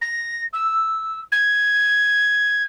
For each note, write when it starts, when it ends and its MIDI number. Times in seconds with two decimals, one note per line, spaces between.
0.01 0.45 94
0.53 1.20 88
1.32 2.63 92